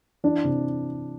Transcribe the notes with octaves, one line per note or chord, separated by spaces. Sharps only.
E3 D4
C3